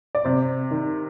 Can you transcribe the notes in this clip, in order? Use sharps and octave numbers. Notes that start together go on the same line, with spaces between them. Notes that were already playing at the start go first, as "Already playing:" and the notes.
D5
C3 C5
D#3